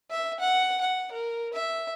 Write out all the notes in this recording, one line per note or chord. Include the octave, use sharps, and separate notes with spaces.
E5
F#5
F#5
A#4
E5